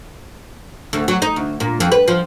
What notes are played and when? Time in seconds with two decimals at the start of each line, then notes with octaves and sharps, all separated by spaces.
0.93 D2
1.08 F#3
1.22 D#4
1.36 D2
1.60 A#2
1.80 F2
1.92 B4
2.08 F3